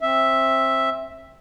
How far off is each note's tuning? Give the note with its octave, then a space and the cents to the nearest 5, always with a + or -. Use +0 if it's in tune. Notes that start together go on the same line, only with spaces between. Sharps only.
C4 +25 E5 +0